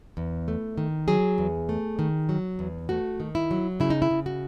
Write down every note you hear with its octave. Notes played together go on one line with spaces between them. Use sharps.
E2
A3
D#3
F#3 G#4
E2
A3
D#3
F#3
E2
A3 F#4
D#3
E4
F#3
C#3 E4
D#4
E4
C#3
F#4